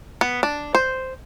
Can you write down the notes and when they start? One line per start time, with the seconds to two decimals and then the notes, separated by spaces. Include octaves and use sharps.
0.21 B3
0.43 D4
0.75 C5